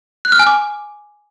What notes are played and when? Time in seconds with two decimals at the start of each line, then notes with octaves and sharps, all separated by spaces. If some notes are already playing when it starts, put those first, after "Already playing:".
0.25 F#6
0.32 F6
0.39 G#5
0.47 D6